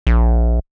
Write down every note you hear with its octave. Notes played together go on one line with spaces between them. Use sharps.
A#1